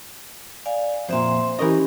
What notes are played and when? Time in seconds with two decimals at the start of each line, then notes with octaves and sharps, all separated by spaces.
0.66 D5 F5 G#5
1.09 F2 A#2 C5 E5 C6
1.59 E3 C#4 G4 A#4 D#5